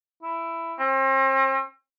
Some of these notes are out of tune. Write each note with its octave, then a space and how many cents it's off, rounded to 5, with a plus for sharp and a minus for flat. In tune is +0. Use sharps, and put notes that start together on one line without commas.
E4 +10
C4 +40